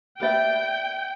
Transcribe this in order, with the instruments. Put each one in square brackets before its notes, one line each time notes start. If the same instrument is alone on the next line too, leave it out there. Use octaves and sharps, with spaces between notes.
[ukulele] B4 D5 E5 [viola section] G5